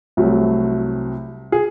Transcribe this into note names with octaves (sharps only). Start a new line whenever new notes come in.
C2 C3 F#3 A3
G#4